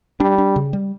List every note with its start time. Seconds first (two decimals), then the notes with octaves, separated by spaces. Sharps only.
0.20 G3 D4
0.38 D4
0.56 C#3
0.73 G3